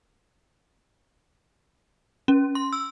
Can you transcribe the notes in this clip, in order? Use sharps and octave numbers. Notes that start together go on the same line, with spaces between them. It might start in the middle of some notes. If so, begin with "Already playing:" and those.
C#4
C6
E6